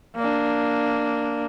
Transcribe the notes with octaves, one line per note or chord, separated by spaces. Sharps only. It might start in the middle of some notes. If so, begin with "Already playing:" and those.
A#3 D4